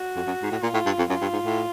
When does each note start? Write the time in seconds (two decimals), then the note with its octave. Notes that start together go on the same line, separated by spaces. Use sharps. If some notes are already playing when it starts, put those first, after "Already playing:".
Already playing: F#4
0.16 F2
0.27 F#2
0.42 G#2
0.51 A2
0.62 A#2 F4
0.74 A2
0.86 G2
0.98 F2
1.09 F#2 F4
1.22 G2
1.33 G#2
1.45 A2